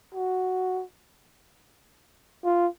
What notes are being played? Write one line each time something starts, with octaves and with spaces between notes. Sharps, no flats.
F#4
F4